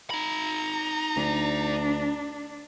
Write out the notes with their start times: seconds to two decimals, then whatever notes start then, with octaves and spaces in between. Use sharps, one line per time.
0.10 D#4 A#5 B5
1.16 D2 D4